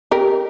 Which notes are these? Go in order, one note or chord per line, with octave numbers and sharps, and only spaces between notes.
G4 A#4